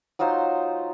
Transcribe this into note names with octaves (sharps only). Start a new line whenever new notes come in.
F#3 D#4 F4 C5